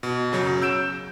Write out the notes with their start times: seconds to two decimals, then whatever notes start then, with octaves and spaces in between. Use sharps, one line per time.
0.03 B2
0.32 F#2 C#3 F#3
0.62 E6 G6 D7 E7